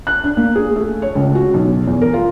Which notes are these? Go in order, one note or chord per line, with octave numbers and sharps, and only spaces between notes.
F#6
D4
A#3
G#4
A3
C#5
C#2
F#4
B1
E2
A#4
F4